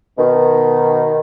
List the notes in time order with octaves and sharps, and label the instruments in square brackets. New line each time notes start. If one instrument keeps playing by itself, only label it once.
[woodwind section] B2 D#3